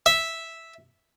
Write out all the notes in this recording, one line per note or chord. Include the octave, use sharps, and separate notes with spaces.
E5